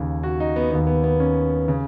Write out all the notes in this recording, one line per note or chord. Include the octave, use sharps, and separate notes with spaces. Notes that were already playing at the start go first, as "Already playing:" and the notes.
Already playing: D#2 C#3
F#4
D#4
B3
D#2 D#3 B3
B3
B3
C#4
C#3